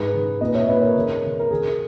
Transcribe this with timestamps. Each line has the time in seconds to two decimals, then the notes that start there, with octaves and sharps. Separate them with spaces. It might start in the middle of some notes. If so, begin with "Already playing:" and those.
Already playing: G#2 D#4 G#4 B4
0.13 C#3
0.41 A#2 B4 D#5
0.55 C#5 E5
0.68 A#2 B4 D#5
0.82 A#4 C#5
0.95 C#3
1.23 C#3
1.39 A#4
1.50 C#3 G#4